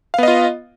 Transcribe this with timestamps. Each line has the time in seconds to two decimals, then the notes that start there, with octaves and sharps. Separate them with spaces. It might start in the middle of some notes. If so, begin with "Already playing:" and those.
0.14 F5
0.18 B3
0.23 D#5
0.28 F4